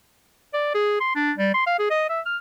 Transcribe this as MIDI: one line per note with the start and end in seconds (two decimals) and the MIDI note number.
0.54 0.74 74
0.74 0.96 68
1.00 1.13 84
1.15 1.32 62
1.37 1.53 55
1.54 1.63 84
1.67 1.78 77
1.79 1.87 68
1.90 2.06 75
2.09 2.21 76
2.26 2.37 89